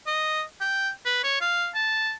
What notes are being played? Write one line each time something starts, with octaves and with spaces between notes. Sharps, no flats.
D#5
G5
B4
C#5
F5
A5